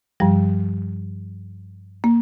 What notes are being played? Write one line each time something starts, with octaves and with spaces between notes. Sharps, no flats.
G2 F3 G3
A#3